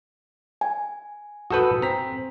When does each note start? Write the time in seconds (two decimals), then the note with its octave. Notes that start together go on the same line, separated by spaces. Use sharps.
0.61 G#5
1.50 F#4 A4 B4 D#6 G6
1.82 C4 A#5 B6